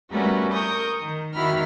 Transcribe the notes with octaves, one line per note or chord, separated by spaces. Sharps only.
G3 A3 B3 C#4 F#4 A#4
A#4 C#6 D#6 G6
D#3
D#3 E4 F#4 B5 F6